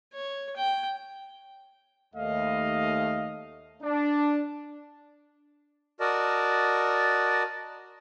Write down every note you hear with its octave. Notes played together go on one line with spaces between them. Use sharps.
C#5
G5
D#2 A3 D#5 F5
D4
F#4 A#4 D5 D#5 A5